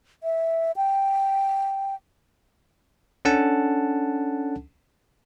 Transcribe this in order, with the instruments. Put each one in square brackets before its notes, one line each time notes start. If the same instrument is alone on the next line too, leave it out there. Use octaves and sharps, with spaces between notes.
[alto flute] E5
G5
[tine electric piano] C#4 D4 A4 F#5 A5